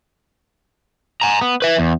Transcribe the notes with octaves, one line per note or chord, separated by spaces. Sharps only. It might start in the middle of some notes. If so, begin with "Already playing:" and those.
G#5 A#5
B3
B4 E5
E2